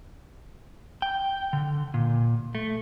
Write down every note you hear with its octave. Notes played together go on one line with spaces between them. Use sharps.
G5
D3
A#2
A3